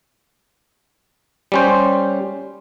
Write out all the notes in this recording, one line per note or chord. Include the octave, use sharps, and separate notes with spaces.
G3 C#4 C5